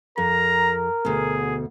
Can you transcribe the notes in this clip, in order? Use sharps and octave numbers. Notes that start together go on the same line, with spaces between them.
F2 A#4 A#5
D2 B2 G#4